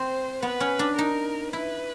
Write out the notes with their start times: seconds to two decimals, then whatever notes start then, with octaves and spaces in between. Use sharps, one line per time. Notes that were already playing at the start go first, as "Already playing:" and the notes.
Already playing: C4 C5
0.42 B3 B4
0.60 C#4
0.79 D4
0.97 D#4 A#4
1.53 E4 B4